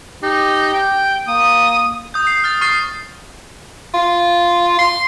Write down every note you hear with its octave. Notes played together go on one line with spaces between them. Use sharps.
D#4 G4
G5
A#3 D#6
D#6 G6
C7
F6 A6
C#6 F6 A6 C7
F4
C6